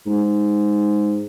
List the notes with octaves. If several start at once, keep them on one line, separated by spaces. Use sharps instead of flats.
G#2